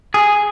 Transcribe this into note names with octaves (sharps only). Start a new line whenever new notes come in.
G#4